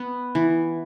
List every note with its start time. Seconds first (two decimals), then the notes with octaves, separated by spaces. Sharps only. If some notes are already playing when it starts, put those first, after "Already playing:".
Already playing: B3
0.35 E3